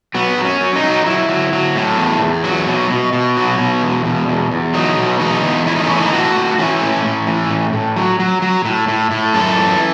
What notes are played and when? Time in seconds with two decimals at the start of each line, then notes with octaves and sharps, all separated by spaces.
0.14 F#3 B3
0.38 F#3
0.45 C#4
0.61 F#3
0.76 D#4
0.83 F#3
1.06 F#3 E4
1.29 F#3
1.53 F#3
1.76 A2
1.98 E2
2.21 E2
2.44 F#3
2.67 B2
2.90 B2
3.13 B2
3.37 F#3
3.59 B2
3.82 E2
4.05 B2
4.28 E2
4.52 E2
4.74 F#3 D#4
4.98 B2
5.20 E2 D#4
5.43 E2
5.66 A2 E4
5.76 D#4
5.87 E3 C#4
5.97 D#4
6.06 E4
6.13 A2 F#4
6.35 A2
6.58 E3 C#4
6.82 A2
7.05 A2
7.27 E3
7.50 A2
7.73 A2
7.97 F#3
8.20 F#3
8.42 F#3
8.65 A2
8.88 A2
9.11 A2
9.34 F#2 A4
9.58 E3